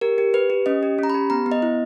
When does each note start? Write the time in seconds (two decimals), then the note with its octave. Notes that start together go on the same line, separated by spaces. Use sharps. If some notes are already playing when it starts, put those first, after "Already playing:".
0.01 G4 A#4
0.18 G4
0.34 G4 B4
0.50 G4
0.66 C#4 D#5
0.83 G4
0.99 C#4 A#5
1.10 G4 B5
1.30 B3 A#5
1.46 B3
1.52 D#5
1.62 E4